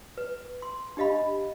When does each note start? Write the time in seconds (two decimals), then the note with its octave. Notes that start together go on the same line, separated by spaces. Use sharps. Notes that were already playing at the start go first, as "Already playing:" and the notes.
0.18 B4
0.62 C6
0.97 D4 G4 D#5 F5 B5